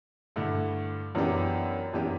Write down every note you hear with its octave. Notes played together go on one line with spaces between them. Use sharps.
G2 D3 A3 E4
F#2 E3 B3 D4 G4
F#2 E3 B3 D4 G4